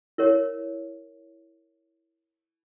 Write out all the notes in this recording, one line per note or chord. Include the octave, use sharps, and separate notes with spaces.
E4 A#4 C#5